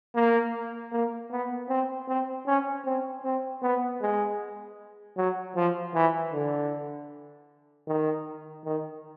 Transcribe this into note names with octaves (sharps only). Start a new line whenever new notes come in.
A#3
A#3
B3
C4
C4
C#4
C4
C4
B3
G#3
F#3
F3
E3
D3
D#3
D#3